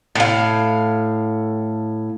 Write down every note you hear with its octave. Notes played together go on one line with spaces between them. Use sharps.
A2 F5